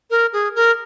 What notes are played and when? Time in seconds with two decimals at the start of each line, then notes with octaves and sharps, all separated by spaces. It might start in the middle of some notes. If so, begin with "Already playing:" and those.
0.10 A#4
0.33 G#4
0.55 A#4